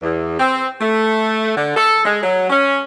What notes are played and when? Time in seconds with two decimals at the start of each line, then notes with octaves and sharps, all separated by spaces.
0.02 E2
0.39 C4
0.81 A3
1.56 D3
1.77 A4
2.05 G#3
2.23 F#3
2.50 C#4